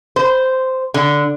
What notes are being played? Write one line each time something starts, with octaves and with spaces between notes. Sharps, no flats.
C5
D3